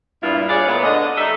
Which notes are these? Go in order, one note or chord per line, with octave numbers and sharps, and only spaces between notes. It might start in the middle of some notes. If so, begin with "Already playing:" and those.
G2 A#2 G3 B3 E4 F4
G#4 B4 C#5 D5
A#2 C#3 A3 B3
D3 D#5
G3 D4 D#4 A4 E5